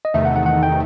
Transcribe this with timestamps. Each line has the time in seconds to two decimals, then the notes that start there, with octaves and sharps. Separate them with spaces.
0.05 D#5
0.14 E2 C3 D#3 A3 D#4 E5
0.25 F#5
0.36 F#5
0.46 F#5
0.63 G5